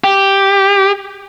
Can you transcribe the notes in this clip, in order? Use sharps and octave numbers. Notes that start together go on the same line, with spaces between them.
G4